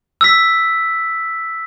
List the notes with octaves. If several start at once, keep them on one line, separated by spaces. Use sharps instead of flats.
E6 B6